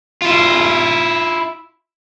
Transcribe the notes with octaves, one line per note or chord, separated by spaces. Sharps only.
E4 F4